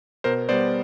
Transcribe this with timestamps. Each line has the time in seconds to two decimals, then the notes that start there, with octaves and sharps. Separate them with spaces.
0.24 B2 A#4 C5
0.49 G3 B3 C5 D5